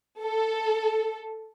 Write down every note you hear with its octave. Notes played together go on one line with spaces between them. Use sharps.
A4